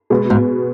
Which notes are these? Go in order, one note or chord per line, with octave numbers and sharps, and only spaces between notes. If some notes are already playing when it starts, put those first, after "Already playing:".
B2 G#3 B3
G#2